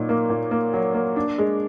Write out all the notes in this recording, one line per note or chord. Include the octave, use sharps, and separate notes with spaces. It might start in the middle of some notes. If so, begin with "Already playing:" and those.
Already playing: A#2 F#3 D#4
A#3
A#2
A#3
F#3
A#3
D4
G#3